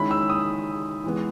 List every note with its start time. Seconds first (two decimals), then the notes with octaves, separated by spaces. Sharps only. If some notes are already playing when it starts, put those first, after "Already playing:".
Already playing: D#3 G#3 C#4 E4 B5
0.11 E6
0.30 D#6
1.04 E3 G#3 B3